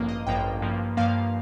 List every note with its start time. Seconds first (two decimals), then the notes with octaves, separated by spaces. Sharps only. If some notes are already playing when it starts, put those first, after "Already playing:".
Already playing: A1 G2 F3 A#3
0.09 D#5
0.27 A1 G2 F3 A#3 G5
0.62 G2 F3 A#3
0.97 G2 F3 A#3 F5